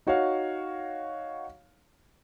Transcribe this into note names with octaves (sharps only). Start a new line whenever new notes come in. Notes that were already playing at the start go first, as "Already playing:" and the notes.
D#4 F#4 C#5 F5